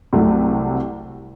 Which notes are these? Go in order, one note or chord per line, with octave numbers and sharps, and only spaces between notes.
C2 C3 F#3 A3